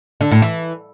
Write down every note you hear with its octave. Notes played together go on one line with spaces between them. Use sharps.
D3
A2
E3